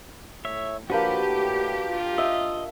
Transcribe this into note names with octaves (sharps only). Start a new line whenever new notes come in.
A2 C#5 E5
F3 A#3 D4 F#4 G4 B4
A2
F4
D#5 E5